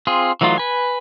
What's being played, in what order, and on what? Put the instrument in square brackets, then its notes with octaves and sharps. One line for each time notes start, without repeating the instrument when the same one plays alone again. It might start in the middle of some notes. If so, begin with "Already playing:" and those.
[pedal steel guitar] C4 F4 G#4
E3 F#3 A3 D#4 F4
B4 G#5